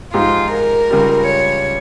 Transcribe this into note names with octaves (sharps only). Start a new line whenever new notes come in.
G#2 F3 G#3 D#4 F4 G4
A#4
C#2 C#3 G3
C#5